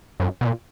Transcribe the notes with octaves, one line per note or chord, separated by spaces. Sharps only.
F#2
B2
A#2